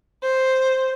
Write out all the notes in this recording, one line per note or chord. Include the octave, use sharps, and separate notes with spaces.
C5